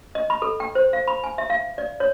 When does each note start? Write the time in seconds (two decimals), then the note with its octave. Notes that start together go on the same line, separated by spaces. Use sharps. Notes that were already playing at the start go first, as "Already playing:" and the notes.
0.15 D#5
0.30 B5
0.42 A4
0.60 G5
0.75 C5
0.93 F5
1.08 B5
1.24 G#5
1.38 E5
1.50 F5
1.78 D5
2.00 C#5